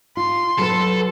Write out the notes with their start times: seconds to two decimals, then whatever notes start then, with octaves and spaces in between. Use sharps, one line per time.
0.17 F4 C6
0.58 F#3 A4 B4